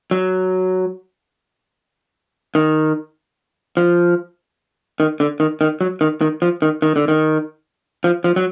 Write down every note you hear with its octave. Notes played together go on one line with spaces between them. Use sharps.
F#3
D#3
F3
D#3
D3
D#3
D#3
F#3
D#3
D#3
F3
D#3
D#3
D3
D#3
F3
F3
F#3